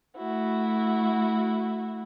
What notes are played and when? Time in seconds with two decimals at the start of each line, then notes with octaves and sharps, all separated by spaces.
0.17 A3 E4 F#4